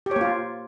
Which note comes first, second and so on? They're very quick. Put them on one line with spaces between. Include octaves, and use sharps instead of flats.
G4 C#5 A#3 F4